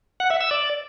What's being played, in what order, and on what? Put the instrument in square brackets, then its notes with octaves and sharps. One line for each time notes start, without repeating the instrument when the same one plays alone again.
[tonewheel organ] F#5
E5
E6
D5